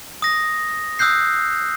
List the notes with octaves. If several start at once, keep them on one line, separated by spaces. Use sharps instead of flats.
D#6 A#6
D#6 E6 F#6 G6 C7